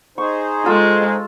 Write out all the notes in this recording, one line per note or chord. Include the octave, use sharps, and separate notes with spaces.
D#4 G#4 C5 C#6
G#3 F4 A4 E6